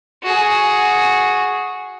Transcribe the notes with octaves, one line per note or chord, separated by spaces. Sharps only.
F#4 G#4